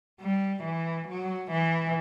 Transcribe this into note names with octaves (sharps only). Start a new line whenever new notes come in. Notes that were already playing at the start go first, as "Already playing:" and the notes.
G3
E3
F#3
E3